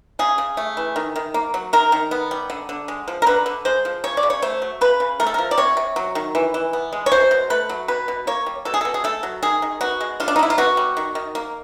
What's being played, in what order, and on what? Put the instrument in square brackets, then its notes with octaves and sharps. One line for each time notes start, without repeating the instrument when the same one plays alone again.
[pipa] C#3 G#4
C#3
A3
E3
D#3
D#3
A#3
F#3
D#3 A#4
D#3
B3
G3
D3
D3
G#3
F3
A#4
D3 B4
D3
G#3 C5
F3
C#3 C#5
D5
C#3
C#5
A3 C5
F#3
C#3 B4
C#3
A3 A#4
A4
F3 A#4
D5
C3 C#5
C3
F#3
D#3
E3
E3
B3
G#3
C#5
B2 C5
B2
A3 B4
F#3
B2 B4
B2
A#3 C#5
G3
B2 A4
G#4
B2 A4
G#4
A3 A4
F#3
D#3 G#4
D#3
B3 F#4
G#3
D3 F4
D4
D#4
D3 E4
F4
B3 F#4
G3
D#3
D#3
A#3